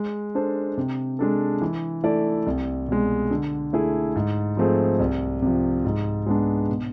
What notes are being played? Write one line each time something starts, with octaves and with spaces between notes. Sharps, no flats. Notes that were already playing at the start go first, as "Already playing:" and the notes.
Already playing: G#3
D4 A4 C5
C3
G#3 D4 A4
E3
A3 E4 A4 D5
C2
B2 G#3
D3
A3 E4 G#4
G#2
F3 A3 C4 G#4
C2
C3 F3
G#2
G#3 B3 D4
B2